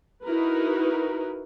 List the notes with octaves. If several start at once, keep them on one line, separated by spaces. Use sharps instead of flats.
D#4 E4 F#4 A#4 B4